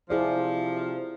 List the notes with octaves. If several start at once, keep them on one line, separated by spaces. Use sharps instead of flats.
C3 F3 E4 G#4 D5